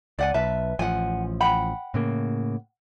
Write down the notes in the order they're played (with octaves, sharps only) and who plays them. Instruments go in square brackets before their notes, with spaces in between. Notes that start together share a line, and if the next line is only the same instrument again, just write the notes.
[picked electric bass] C#2 [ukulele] D5 F#5 G#5
[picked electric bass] B1 [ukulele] B4 E5 A5
[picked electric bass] A1 F3 [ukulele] F#5 G#5
[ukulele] F#5 G5 B5
[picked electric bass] A2 C#3 A#3